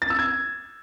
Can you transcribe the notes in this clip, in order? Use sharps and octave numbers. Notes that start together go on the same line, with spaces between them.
A6
E6
G#6